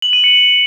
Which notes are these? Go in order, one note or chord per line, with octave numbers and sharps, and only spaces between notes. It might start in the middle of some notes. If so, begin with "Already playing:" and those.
F#7
D#7
C#7